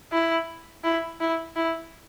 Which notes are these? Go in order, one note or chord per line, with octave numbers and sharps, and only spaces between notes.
E4
E4
E4
E4